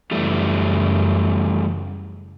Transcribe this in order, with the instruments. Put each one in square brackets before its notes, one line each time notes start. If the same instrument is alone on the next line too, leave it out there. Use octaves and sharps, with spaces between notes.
[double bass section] F#2 C#3 [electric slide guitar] E3 G3 A3